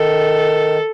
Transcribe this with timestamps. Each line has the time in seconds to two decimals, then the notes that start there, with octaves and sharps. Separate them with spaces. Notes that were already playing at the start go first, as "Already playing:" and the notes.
Already playing: D#3 A4